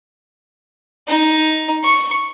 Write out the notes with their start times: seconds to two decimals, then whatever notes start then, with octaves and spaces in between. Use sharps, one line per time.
1.08 D#4
1.83 C#6